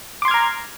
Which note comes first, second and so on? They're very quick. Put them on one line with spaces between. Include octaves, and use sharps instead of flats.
D6 C6 G#6 F6 A#5